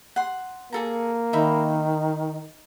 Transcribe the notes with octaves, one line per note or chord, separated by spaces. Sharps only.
F#5 C6
A#3 G#4 A4 A#5
D#3 D#4 E5 B5